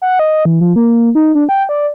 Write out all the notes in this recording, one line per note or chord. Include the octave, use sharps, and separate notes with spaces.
F#5
D#5
E3
F3
A#3
D#4
D4
G5
D5